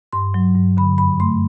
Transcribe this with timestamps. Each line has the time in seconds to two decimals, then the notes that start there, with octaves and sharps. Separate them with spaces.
0.13 G2 C6
0.34 F#3
0.56 G2
0.77 D3 B5
0.98 F#2 B5
1.20 A3 C6